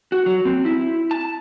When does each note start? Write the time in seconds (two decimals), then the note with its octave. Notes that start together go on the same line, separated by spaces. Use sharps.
0.12 F#4
0.26 F#3
0.45 C4
0.65 E4
1.11 A5